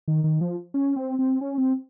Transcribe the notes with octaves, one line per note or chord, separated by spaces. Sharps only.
D#3
D#3
F3
C#4
C4
C4
C#4
C4